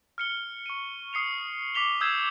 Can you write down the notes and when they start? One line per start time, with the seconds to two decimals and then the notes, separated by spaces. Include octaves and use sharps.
0.18 F6 C#7 G7
0.66 C#6 D#7
1.13 D#6 C7 C#7 F7
1.75 D6 B6 F7 G7
2.01 D#6 E6 G6 G#6 C7 E7